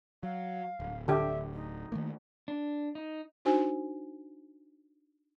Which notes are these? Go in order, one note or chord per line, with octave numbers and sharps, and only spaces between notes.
F#3 F5
D1
D3 G4 E5
D#4
D#3 A3 A#3
D4
D#4
D4 D#4 F#4 C5 G#5